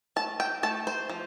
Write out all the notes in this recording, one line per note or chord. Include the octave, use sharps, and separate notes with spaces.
A3 A5
G5
A3 A5
C5
F3